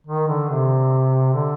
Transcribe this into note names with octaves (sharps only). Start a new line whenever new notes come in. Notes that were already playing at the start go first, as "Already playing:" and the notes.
D#3
D3
C3
D3